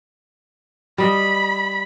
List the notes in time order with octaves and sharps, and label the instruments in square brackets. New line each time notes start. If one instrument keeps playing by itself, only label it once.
[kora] G3 D#5 [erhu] B5